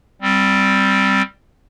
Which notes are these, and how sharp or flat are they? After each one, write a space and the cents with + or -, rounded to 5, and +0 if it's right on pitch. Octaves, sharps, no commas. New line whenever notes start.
G3 +0 C4 +0